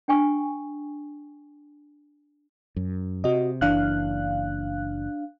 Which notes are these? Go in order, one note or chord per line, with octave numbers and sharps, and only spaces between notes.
D4 G5 G#5 C#6
F#2
C3 F#4 D#5
F#1 E3 D4 F5 F#6